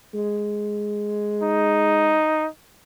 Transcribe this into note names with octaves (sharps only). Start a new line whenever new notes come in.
G#3
D#4